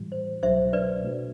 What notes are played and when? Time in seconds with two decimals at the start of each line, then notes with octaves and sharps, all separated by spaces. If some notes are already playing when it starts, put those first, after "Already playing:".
Already playing: A2 E3 G3
0.12 C5
0.43 C2 B2 F#3 C5 E5
0.73 B4 D5
1.02 B2 A3 D4 F#4